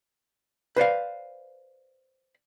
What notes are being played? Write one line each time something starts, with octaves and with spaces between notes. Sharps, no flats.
B4 C5 D5 F5